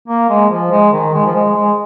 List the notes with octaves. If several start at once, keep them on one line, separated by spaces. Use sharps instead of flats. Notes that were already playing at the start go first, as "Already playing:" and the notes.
A#3
G#3
F3
G#3
D#3
G#3
F3
G#3
G#3